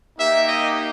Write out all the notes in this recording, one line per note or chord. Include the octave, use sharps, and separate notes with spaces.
A#3 D#4 G4 E5
D#5